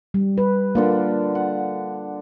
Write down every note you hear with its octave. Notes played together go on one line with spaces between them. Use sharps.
G3
B4
D3 A#3 D4 F4
F#5